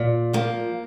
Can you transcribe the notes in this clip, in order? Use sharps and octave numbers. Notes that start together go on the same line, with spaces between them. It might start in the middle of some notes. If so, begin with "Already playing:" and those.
Already playing: A#2
F3 A#3